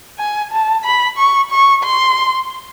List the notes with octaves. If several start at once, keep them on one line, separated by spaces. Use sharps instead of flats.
G#5
A5
B5
C#6
C#6
C6